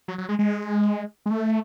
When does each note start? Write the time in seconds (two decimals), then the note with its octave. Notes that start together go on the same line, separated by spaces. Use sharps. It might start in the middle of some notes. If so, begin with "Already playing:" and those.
0.08 F#3
0.18 F#3
0.29 G#3
0.39 G#3
1.26 G#3
1.31 A3